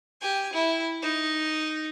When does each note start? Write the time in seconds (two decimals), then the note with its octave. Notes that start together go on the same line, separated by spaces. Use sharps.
0.21 G4 G#5
0.53 E4
1.02 D#4